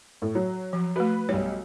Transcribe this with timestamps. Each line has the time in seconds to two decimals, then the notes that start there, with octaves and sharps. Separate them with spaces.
0.22 A2
0.35 F#3
0.73 F3
0.96 A3 F#4 B4
1.29 B1 G3 C#5